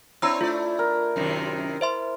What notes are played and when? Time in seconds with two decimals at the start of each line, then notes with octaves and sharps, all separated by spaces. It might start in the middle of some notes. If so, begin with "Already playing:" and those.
0.22 C4 D4 E4 C#5 A#5 E6
0.41 A3 F4 D5
0.79 A#4
1.16 F#2 C3 D#3
1.81 C5 E5 C6